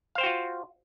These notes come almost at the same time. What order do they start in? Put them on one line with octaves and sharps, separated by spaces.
F5 C5 G5 F#4 F4